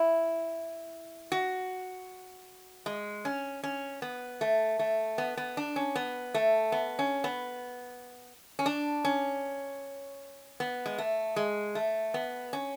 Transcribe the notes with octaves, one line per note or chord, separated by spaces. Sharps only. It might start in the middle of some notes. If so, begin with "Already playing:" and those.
Already playing: E4
F#4
G#3
C#4
C#4
B3
A3
A3
B3
B3
D4
C#4
B3
A3
B3
C#4
B3
C#4
D4
C#4
B3
G#3
A3
G#3
A3
B3
C#4